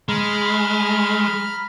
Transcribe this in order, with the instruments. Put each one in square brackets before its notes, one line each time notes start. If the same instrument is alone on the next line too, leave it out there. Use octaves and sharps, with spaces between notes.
[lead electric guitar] G#3 [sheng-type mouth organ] A#5 B5 F6